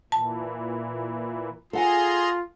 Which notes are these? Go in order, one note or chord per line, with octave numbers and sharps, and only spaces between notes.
A#2 E3 A5
F4 G#4 A4 F#5 G#5 A#5 C6